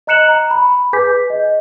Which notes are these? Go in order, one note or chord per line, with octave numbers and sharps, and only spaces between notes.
D#5 A#5 F#6 C#7 E7 F#7
A#5
B5
G#4 B4 G#5 D6 G6 B6
D#5